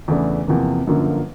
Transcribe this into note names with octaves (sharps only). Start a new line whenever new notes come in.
E2 C#3 E3 A3 D4
E2 C3 F3 A#3
G1 F#2 D3 F3 A#3